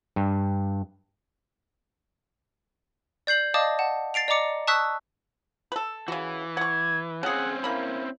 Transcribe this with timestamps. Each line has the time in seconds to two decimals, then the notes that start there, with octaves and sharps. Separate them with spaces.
0.16 G2
3.27 D5 G6 C7 F#7
3.54 D5 D#5 F5 A5 D6 D#6
3.79 F#5 A5
4.14 A6 C7 D7 F7
4.28 D5 D#5 A#5 D6 C#7
4.67 A5 C#6 D#6 E6 F#6 B6
5.72 A4 B4
6.08 C#3 E3 F#4
6.57 F#5 C#6 G#6
7.23 C#3 C4 C#4 G#4 F#5
7.64 A#3 E4 B5